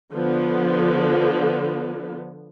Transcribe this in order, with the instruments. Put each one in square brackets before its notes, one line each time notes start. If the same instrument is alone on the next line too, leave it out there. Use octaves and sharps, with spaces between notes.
[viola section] D3 F3 B3